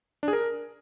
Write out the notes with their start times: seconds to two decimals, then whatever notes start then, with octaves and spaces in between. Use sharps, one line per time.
0.23 D4
0.28 G#4
0.33 A#4